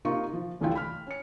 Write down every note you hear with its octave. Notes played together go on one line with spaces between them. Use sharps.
C3 A#3 D#4 F4 C#6
F3
F1 C2 E3 A3 F4 G5
B5 F6
C#4 C#7